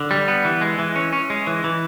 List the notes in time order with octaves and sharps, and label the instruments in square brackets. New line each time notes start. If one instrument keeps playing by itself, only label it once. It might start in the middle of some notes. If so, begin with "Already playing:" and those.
Already playing: [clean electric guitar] D3
G3
B3
E3
G#3
E3
C#4
C#4
G#3
E3
E3